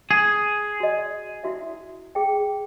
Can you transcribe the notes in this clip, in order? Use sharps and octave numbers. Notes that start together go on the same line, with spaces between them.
G#4
F#4 D#5
E4 F#4 E5
G#4 G5